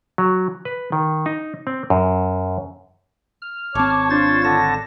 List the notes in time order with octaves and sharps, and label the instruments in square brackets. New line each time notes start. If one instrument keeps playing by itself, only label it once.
[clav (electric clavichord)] F#3
B4
D#3
D#4
C4
F#2
[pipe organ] F6
[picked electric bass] G#1 C4 [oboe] C#5 [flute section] A5 D6
[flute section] D4 F4 [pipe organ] C5 A6
[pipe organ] D3 A5 A#6